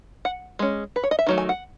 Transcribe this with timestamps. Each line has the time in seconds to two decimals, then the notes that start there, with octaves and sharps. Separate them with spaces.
0.25 F#5
0.59 G#3 C#4
0.96 B4
1.03 C#5
1.11 D#5
1.19 E5
1.27 D#3 F#3 A3
1.38 G#5
1.49 F#5